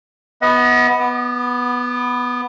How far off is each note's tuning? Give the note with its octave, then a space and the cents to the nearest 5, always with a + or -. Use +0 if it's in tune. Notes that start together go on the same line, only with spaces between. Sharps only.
B3 +0 D#5 +40 F#5 +0
B3 +0 D6 +45